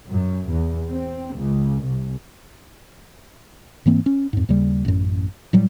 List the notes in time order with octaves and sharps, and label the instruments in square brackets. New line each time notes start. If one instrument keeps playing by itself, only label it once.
[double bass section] F#2
E2
C4
C#2
C2
[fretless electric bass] G#2 E3 A#3 C4
C#4
F2 G#2
D#2 C#3 G3
A1 F#2
A2 F#3 G3